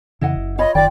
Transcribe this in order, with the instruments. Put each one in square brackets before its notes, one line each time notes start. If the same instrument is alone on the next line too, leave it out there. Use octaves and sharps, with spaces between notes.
[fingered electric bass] F2 C#3 E3 [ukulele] E4 D#5 F#5
[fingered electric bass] F#1
[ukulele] F4 C#5 B5 [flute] D#5
[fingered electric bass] F#1 D#3 [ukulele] F4 G5 [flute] D5